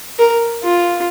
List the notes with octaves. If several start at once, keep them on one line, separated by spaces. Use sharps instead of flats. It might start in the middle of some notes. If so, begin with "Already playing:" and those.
A#4
F4